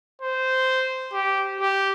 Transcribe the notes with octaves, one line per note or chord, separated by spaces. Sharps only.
C5
G4
G4